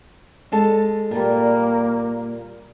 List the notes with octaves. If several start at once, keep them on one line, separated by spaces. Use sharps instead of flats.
G#3 A4 A5
A#2 G3 A#3